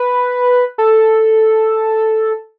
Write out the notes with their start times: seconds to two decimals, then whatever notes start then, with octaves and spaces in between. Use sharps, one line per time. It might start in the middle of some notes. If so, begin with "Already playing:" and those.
Already playing: B4
0.78 A4